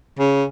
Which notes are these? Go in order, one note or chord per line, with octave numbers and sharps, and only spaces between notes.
C#3